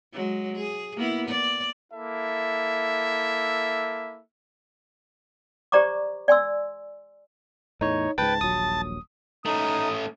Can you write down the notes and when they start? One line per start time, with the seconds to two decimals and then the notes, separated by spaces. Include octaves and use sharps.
0.14 F#3 G#3
0.56 G#4
0.97 A#3 B3 E4
1.28 D5
1.93 A#3 E4 A4 E5
5.72 G4 C5 D5 A#5 C#6 D6
6.28 D5 G#5 C6 E6
7.81 E2 A2 D#4 C#5
8.18 C#2 G#2 B4 G5 A5
8.41 D#1 A#1 F#3 D#6
9.45 A3 C#4 D#4 D#6